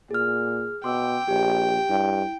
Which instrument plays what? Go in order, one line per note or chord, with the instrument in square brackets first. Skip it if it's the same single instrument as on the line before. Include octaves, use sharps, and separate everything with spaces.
[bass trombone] A#2 [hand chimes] G#4 F6
[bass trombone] B2 [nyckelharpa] G5 [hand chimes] C6 D6 E6
[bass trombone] A#1 [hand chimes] G4
[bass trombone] G2 [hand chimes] E4